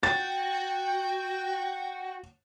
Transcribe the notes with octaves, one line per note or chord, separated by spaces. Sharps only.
F#4 G5 A6